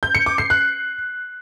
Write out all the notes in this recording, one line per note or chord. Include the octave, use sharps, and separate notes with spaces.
G6
C#7
D6
C7
F#6